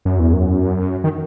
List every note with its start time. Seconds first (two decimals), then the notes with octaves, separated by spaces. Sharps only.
0.05 F#2
0.19 E2
0.33 F#2
1.04 D#3